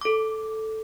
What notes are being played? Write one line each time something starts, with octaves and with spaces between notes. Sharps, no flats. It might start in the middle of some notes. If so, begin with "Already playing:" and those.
A4 D6